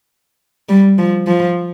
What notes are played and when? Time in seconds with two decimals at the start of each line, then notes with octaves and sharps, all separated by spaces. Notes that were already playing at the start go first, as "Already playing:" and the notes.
0.69 G3
0.98 F3
1.27 F3